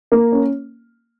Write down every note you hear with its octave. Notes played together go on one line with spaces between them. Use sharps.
A#3
C#4